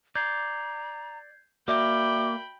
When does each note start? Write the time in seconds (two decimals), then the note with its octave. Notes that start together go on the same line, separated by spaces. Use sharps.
0.15 D5 A#5 G6 G#6 C7
1.68 A#3 F#4 D5 E5 G5 B5 D6